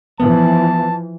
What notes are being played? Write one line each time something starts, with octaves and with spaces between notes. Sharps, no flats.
E3 F3 B3 A5